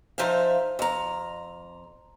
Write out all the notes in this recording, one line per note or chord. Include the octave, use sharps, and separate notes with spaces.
F3 D#4 C5 E5 F5
F2 A#5